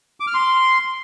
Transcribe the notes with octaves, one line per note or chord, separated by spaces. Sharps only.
D6
F6
C6